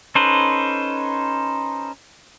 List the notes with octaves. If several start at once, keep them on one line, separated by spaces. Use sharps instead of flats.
C#4 D#4 A4 B4 C5